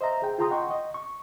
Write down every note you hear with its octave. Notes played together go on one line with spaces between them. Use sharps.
C5 D#5 E5 A#5
G#4 G5
F4 G#4 G5 A#5 C6 D#6
D#5 F#5 G5 C6 C#6
D#5
C#6